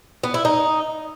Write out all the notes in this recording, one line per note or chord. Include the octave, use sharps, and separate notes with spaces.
B3
E4
D#4